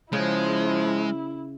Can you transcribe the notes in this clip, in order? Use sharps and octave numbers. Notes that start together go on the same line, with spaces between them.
C#3 F3 G#3 E4